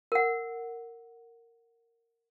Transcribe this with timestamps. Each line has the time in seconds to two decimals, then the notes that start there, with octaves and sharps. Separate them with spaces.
0.12 A#4 F#5